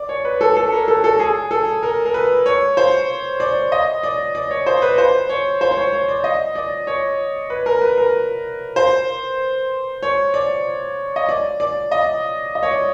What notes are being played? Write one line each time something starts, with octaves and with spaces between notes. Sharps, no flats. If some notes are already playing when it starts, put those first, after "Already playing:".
Already playing: D5
C#5
B4
A4
A4
A#4
A4
A4
G#4
A4
A#4
A#4
B4
C#5
C5
D5
D#5
D5
D5
C#5
C5
B4
C5
C#5
C5
C5
C#5
C#5
D5
D#5
D5
C#5
B4
A#4
B4
A#4
C5
C#5
D5
D#5
D5
D5
D#5
D#5
C#5
D5